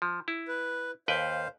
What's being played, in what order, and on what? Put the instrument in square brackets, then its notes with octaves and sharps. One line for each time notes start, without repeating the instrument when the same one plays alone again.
[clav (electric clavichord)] F3
E4
[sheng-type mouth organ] B4
[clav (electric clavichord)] D#2 B4 G5 [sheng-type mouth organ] C5 F5